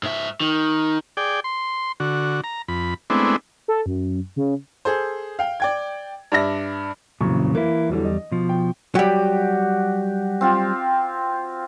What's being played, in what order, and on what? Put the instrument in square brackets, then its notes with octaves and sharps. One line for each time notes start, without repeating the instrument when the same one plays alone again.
[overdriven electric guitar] G#2 E5
D#3
[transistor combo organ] G#4 D5 G5
C6
D3 F#4
A#5
F2 B5
G#3 A3 B3 C4 D4 E4
[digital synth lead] A4
F#2
C#3
[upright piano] G#4 A4 C5
F5 G5
D5 G5 G#6
G2 D4 E5 A#6
[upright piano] F1 F#2 C#6 [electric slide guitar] A#2 C#3 E3
[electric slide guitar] E3 E4 [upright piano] A#3
[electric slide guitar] E2 G3 [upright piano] D3 E3 F#3
[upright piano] D#5
[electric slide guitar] B2 F3
[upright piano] G5
[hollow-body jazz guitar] F#3 G3 [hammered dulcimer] F#4 G4
[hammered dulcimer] C4 F4 G4